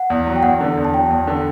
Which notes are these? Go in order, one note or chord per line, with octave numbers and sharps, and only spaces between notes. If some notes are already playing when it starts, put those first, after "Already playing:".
Already playing: F#5
E2
F#3
G5
E2 F#5
D3
E2
A5
F#3 G5
E2
D3